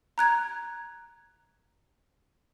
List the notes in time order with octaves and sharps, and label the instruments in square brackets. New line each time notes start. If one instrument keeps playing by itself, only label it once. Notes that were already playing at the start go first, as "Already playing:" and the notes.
[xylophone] A#5 F#6 G#6